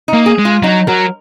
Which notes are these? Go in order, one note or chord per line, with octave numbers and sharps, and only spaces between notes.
D#4
A#3
G#4
G#3
F4
F#3 D#4
F#3 A#4